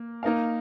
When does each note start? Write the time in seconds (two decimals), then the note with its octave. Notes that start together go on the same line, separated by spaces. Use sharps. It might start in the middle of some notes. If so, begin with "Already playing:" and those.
Already playing: A#3
0.23 A#3 D#4 A#4 F5